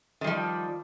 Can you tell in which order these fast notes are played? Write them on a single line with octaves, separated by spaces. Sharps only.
D#3 G3 F3